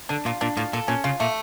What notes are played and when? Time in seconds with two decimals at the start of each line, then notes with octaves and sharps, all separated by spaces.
0.09 D3 D4
0.25 A#2 F4
0.41 A#2 D4
0.57 A2 F4
0.73 A#2 A4
0.88 A#2 C#4
1.04 C#3 F4
1.20 A#2 A3